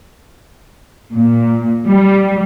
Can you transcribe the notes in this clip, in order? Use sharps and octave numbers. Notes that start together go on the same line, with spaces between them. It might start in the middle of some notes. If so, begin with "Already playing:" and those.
A#2
G3